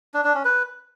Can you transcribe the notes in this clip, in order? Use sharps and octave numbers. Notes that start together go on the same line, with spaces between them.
D4
D4
C#4
B4